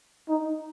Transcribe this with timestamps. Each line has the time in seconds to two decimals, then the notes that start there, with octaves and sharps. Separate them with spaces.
0.29 D#4